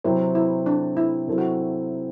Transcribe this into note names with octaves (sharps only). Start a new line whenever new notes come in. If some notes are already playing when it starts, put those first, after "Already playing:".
C3 F#3 C4 E4
E4
D4
E4
C3 F#3 C4 E4 A4
F#4